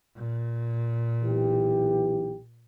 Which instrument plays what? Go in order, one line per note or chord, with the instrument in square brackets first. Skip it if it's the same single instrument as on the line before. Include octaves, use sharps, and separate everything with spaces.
[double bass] A#2
[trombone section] B1 E3 G4